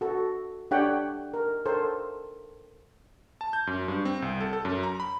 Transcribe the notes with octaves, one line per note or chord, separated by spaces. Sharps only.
F#4 A4
D4 G4 A4 C#5 F#5 G5
A#4
A4 A#4 C5 C#5
A5
G6
F#2
G2
C4
C2
A4
A4
F#2
A#5
B5